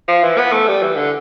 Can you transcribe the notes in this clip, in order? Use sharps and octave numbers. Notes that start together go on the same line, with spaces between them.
F3
E3
B3
A3
G3
E3
D3